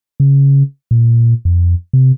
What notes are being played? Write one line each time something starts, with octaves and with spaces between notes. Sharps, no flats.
C#3
A#2
F2
C3